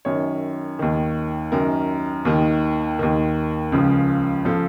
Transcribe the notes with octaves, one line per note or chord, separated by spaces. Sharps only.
F#2 D#3 C#5
D#2 D#3
F#2 D#3 A#4
D#2 D#3
D#2 D#3
C#2 C#3 F3
C#3 F3 A4